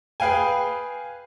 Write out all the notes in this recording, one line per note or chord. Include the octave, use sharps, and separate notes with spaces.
G#4 B4 F5 G5 G#5